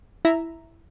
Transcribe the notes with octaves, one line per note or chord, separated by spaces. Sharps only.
E4 E5 A#5